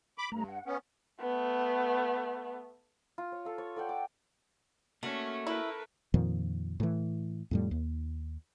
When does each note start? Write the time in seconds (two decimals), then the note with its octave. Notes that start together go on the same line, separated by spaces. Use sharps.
0.18 B5 D6
0.32 G2 A3 A#5
0.48 F#5
0.66 B3 C#4
1.22 A3 B3
3.18 F4
3.32 C#5
3.45 A4 F5
3.58 C#5
3.76 A4 D5 F#5 G5
3.89 D6
5.03 A3 A#3 C#4 F#4
5.47 E4 A#4 B4
6.14 F2 A#2 D#3 F3
6.80 A2 E3
7.51 F2 A2 G3
7.71 D#2